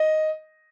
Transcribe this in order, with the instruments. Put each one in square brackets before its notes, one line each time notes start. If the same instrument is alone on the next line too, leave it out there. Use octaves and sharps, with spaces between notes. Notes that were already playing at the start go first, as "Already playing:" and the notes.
Already playing: [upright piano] D#5